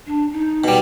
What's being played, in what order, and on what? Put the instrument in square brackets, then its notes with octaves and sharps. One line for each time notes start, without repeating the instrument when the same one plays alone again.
[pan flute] D4
D#4
[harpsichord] B2 G3